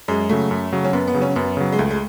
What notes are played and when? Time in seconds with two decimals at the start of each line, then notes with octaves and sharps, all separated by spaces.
0.08 F#2 G#3
0.29 C#3 F#3 A3
0.51 F#2
0.73 C#3 F#3
0.84 C#4
0.93 F#2 B3
1.08 B3
1.14 C#3 F#3
1.22 C#4
1.36 F#2 B3
1.57 C#3 F#3
1.73 G#3
1.79 C#2 A3
1.91 G#3